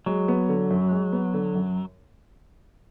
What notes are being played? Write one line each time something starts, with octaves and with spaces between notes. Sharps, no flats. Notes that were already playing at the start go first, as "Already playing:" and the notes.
F#3 G#3
B3
D3
F#2
G#3
B3
D3
F#2